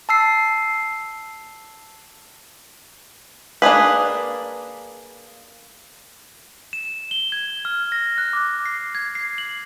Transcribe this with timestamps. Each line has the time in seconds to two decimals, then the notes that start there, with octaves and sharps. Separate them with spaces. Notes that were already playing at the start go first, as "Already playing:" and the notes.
0.09 A5 E6 C7
3.62 A#3 D4 G#4 B4
6.73 E7
7.11 G7
7.32 G#6
7.65 F6
7.92 A#6
8.18 F#6
8.33 D6
8.66 C7
8.95 G#6
9.15 C7
9.38 F#7